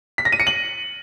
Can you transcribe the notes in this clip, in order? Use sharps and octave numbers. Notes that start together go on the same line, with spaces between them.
B6
A#6
D#7
C#7
F#7